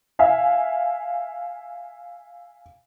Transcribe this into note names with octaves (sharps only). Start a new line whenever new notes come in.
E5 F5 G#5